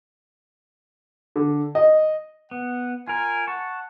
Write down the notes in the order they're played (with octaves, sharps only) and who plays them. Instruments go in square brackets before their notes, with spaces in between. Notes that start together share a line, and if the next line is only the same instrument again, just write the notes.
[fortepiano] D3
D#5
[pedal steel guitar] B3 [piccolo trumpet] F#5
[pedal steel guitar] F4 A#4 [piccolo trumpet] G#5
[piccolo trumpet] F#5 [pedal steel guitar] A5 C#6